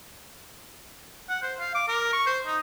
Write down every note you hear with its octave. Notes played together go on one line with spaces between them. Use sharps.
F#5
C5
F5
D6
A#4
C#6
C5
D#4